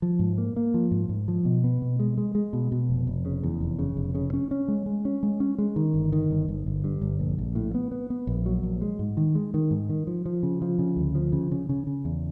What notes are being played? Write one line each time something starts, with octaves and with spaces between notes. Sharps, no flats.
F3
G#2
A#3
A#3
F3
G#2
G#2
F3
B2
B3
B2
G#3
G#3
G#3
B2
B2
F1
F1
C#3
E2
F1
C#3
F1
C#3
C#4
C#4
G#3
G#3
C#4
G#3
C#4
G#3
D#3
G1
D#3
G1
G1
G1
G2
G1
A#1
A#1
A2
B3
B3
B3
A#1
F#3
A#1
G#3
G#2
D#3
G#3
D#3
G#2
D#3
F3
F3
C#3
F3
C#3
D2
F3
C#3
C#3
C#3
C#3
E2